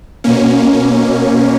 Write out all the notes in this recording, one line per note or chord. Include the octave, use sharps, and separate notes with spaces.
B2 A#3 C#4